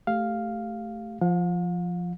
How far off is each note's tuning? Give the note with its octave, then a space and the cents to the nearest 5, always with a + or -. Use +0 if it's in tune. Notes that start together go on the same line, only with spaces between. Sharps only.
A3 +0 G4 +0 F5 +0
F3 +0 F5 +45